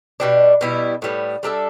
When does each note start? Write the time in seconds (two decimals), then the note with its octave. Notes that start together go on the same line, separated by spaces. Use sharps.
0.20 B2 G3 D4
0.61 B2 G3 E4
1.02 A2 G3 B3
1.43 G3 D4 A4 E5